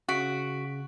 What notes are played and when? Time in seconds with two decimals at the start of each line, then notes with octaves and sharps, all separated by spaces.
0.09 C#3 F#4 F#6 B6 D7